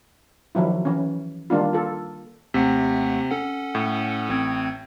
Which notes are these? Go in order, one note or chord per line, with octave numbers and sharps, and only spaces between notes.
D#3 F3 F#3 E4
E3 C#4
D#3 G3 A#3 D4 F4
F4 A4
D#2 C3 A3 F#5
C#4 A4 F#5
A2
A1 C4 G#6